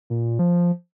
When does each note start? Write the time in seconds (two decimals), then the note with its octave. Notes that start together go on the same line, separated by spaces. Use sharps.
0.10 A#2
0.39 F3